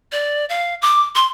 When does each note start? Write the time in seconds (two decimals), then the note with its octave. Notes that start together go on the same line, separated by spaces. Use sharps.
0.12 D5
0.49 F5
0.82 D6
1.15 C6